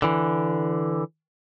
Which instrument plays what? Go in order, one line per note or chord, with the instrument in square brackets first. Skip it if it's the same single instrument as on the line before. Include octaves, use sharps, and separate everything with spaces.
[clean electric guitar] D3 E3